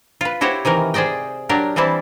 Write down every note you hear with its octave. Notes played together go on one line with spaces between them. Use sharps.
F4 B4
E4 F#4 G4 C5 C#5
C3 D#3 E3 A#4
G#4 C5 D5 D#5 G5
F#3 D4 G4 A#4
E3 G3 C4 E4 A5